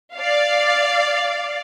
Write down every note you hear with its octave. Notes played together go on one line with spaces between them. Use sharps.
D5 F5